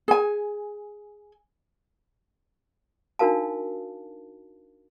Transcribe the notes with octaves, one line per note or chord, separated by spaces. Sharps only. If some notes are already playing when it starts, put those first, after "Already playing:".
G#4 G#5
D4 D#4 F#4 A#4 F5 A5